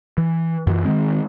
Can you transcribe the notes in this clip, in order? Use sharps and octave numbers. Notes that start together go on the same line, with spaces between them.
E3
F#2 E3
D#3 E3 G#3 C4